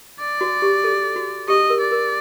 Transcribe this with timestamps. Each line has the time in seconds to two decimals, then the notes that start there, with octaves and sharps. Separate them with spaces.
0.19 D5
0.41 F#4
0.62 G4
0.84 A4
1.16 F#4
1.48 G4 D#5
1.70 A#4
1.80 D5
1.91 A#4